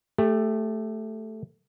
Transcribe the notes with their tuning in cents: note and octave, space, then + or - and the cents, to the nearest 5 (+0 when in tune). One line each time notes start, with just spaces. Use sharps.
A3 +0 G4 +25